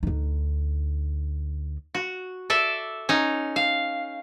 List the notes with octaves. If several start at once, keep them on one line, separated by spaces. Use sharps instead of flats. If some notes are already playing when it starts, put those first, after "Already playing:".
D2 D#4
F#4
A4 D5 E5
C#4 D#4
F5